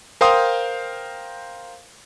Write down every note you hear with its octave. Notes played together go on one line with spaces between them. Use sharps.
A#4 C5 F5 G5 C6 D#6